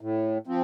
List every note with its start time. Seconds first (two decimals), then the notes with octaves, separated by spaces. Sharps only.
0.01 A2
0.47 F3 C4